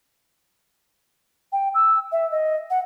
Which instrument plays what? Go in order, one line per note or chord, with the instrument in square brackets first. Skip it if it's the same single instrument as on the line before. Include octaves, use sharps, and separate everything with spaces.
[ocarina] G5
E6
E5
D#5
F#5